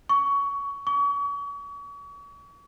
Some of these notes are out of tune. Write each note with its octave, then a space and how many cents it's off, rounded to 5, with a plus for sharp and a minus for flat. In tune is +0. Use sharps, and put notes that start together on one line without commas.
C#6 +20
C#6 +40